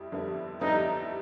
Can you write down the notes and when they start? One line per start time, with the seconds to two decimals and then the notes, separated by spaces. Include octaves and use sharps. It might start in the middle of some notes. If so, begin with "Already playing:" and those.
Already playing: F2 G3 E4
0.12 F2 D3 G3 B3 E4
0.61 F2 D3 G3 B3 D#4 E4